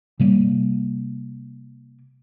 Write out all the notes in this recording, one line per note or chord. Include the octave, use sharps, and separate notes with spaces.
C3 G3 A#3